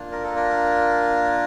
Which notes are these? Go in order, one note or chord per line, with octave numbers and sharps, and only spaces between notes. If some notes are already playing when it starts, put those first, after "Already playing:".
Already playing: A#3 D4 F4
A#4
A4
A#4